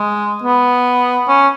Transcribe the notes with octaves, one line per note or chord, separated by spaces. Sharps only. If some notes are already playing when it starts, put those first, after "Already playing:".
Already playing: G#3
B3
C#4